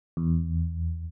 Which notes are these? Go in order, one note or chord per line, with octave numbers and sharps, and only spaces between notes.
E2